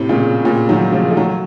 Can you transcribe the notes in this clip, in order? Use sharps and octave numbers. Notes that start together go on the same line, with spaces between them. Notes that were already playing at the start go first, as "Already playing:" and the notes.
Already playing: A2 C3
A#2 C#3
A#2 C#3
D#3 F#3
C#3 F3
A3
D#3 F#3